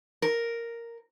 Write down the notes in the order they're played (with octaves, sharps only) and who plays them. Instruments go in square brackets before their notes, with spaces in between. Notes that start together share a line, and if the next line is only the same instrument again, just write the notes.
[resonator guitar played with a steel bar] A#4